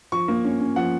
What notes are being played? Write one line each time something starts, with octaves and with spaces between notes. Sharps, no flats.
F3 C#6
A#3
C#4
C#4
F3 F#5